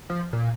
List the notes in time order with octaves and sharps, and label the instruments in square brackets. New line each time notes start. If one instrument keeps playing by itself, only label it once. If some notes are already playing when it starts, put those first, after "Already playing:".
[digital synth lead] F3
A#2